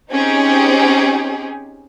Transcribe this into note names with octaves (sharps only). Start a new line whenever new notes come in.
C4 C#4 D#4 G4 G#4